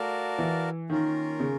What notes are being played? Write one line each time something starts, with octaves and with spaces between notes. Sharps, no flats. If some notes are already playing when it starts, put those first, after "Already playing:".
Already playing: A3 F#4 A#4 D5 F5 A5
E3
D#3 A#3 C#4 F4 A#4
C#3